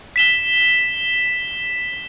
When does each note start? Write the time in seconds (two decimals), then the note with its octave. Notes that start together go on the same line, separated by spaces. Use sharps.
0.16 B6 E7 G7